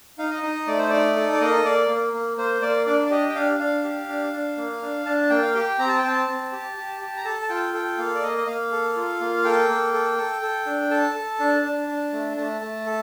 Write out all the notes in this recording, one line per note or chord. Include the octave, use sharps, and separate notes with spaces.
D#4 F5
D#5
D#4
A3 D5
C5
D#4 D5
A4
D5
A#3 D#5
A#3 D5
A#3
A#3
A#3 C5
A#3 D5
D4 D5
D5
G4 D#5
G5
D4 F5
D4 F5
G4
D4
D4
A#3
D4
D4 A5
A#3 G5
F5
G4 G5
C4 A#5
A5
G5
C4 A5
C4
G4
G4
G4
A#5
A4 A5
A5
F4 G5
A4 G5
A#3 F5
D5
A#3 D#5
D#5
A#3 F5
A4
F4
A#3
A4 G5
A#3
A4
A4
A4
D4
A4 A5
A4
D4
D4
D4
A3
A3 A5
A3
A4